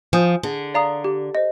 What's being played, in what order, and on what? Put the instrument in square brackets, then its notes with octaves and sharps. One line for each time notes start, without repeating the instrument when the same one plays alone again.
[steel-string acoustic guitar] F3 [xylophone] G#5 D#6 G6
[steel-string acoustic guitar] D3 [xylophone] G#4
[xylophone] D5 F5 A#5 D#6
G4
C5 D#5